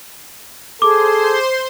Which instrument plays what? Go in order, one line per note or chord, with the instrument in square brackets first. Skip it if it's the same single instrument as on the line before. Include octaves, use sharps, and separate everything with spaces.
[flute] G#4 [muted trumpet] A4 [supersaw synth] C5 C6 [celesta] D6